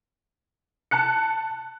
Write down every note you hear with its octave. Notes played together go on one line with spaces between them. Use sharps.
A5 F#6 C#7